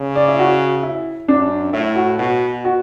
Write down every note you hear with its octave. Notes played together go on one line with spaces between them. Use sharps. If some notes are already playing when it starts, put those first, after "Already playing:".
Already playing: C#3
D5
E4
F#4
E4
F#2 D4
A2 E4
F#4
B2 F#4
F#4